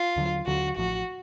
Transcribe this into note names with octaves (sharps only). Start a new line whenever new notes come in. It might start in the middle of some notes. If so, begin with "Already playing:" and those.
Already playing: F4
D#2 D3 F#3
D#2 D3 F#3 F#4
A1 A2 F3 F#4